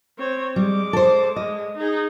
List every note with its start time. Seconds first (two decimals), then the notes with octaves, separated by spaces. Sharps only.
0.18 C4 C#5
0.56 G3 G#3 D6
0.93 A4 C5
1.36 G#3 D#5
1.77 D#4 G#4